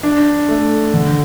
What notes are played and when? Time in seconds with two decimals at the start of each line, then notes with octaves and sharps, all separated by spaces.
0.03 D4
0.49 A3
0.94 D3